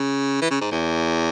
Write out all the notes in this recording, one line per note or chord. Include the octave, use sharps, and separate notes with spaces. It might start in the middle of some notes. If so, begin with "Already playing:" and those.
Already playing: C#3
E3
C#3
G#2
E2